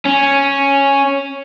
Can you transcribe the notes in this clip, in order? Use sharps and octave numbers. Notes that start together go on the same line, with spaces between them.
C#4